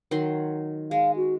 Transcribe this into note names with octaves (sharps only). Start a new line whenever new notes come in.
D#3 F#3 C6
G#3 F5
F#4